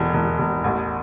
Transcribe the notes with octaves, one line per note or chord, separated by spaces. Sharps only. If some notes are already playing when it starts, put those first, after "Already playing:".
Already playing: E1 E3
E1
E1
A1